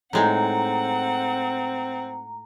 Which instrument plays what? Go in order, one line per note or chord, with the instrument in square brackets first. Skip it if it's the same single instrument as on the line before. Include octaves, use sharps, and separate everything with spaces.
[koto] A2 G#3 D#4 [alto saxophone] C4 [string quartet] F#5 [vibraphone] A#5